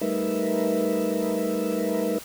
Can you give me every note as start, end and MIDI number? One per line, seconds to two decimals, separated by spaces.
0.01 2.18 55
0.01 2.18 57
0.01 2.18 63
0.01 2.18 70
0.01 2.18 71
0.01 2.18 76